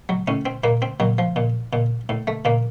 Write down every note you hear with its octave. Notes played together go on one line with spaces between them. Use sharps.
F#3
A2 C#4
C4
A#2 A#3
C4
A#2 F#3
F3
A#2
A#2
A2
A3
A#2 A#3